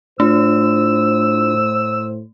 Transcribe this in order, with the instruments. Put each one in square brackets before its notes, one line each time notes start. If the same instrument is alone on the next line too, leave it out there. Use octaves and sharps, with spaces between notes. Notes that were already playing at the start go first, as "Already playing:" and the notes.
[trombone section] A2 C5 [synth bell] A3 [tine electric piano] D4 F4 [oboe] E6